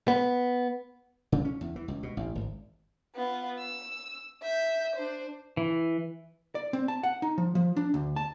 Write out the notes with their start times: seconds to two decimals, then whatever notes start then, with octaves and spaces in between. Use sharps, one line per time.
0.08 B3
1.32 C#3
1.45 C#4
1.61 E2
1.76 E3
1.88 C#2
2.03 B2
2.17 A1
2.35 G#1
3.16 B3 F4
3.60 E6
4.43 E5 G6
4.96 D4 C5
5.57 E3
6.55 D5
6.73 C4
6.88 A5
7.03 F#5
7.22 D#4
7.38 F3
7.55 F3
7.76 D4
7.94 D2
8.16 A5